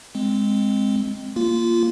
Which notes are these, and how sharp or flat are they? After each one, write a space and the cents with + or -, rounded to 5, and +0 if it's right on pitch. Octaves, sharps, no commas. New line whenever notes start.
G#3 +0 C4 +0
A#3 +0 F4 -15